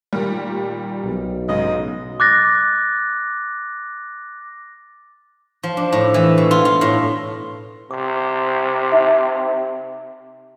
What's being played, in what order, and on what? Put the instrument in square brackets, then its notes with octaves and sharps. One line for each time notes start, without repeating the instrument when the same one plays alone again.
[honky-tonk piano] A#2 D#3 G3
[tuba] B1
[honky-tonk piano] G#2 C#3 [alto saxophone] D#5
[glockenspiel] D6 F#6 A6 A#6
[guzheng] F3
D4
A2
E3
B2
F4
F4
A2
[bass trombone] C3 [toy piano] D6
[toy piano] D#4 E5